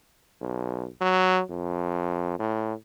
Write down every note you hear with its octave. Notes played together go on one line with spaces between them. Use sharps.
B1
F#3
F2
A2